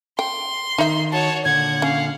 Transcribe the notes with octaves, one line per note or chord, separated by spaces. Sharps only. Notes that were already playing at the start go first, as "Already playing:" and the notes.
G5 C6
D#3 D#4 E5
F#4 C#5 A5
A#2 D3 F#5 G#6
C#4 F5